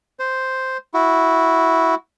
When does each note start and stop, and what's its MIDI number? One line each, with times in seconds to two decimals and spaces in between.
0.20 0.77 72
0.94 1.95 64
0.94 1.95 66